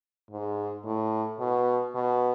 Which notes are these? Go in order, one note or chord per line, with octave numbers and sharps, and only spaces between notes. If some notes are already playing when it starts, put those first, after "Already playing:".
G#2
A2
B2
B2